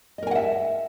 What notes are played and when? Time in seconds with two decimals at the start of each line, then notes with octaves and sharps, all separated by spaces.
0.18 D#5
0.23 A#4
0.27 G#5
0.31 F#5
0.35 E5